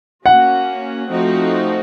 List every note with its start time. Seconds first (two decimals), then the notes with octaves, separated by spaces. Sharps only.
0.25 A#3 C#4 F#4 F#5
1.09 F3 A3 C4 D#4 F#4